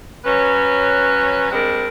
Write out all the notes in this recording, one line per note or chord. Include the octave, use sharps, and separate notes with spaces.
F#3 C#4 B4
G3 G#3 C4 D4 A#4